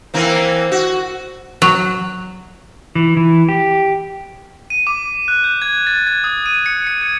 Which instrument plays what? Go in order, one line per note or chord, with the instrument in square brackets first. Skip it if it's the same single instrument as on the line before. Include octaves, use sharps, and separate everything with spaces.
[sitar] E3 A#3 C4
F#4
[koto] F#3
[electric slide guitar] E3
E3
G4
[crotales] D#7
D6
F#6
G6
G#6
A6
G#6
D#6
D#7
C#7
C#7
G#6